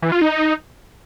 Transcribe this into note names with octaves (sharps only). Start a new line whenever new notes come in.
E3
F4
D#4